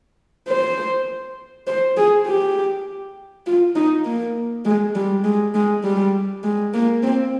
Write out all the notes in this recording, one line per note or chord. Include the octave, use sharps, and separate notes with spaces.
C5
C5
G#4
G4
F4
D#4
A#3
G#3
G3
G#3
G#3
G3
G#3
A#3
C4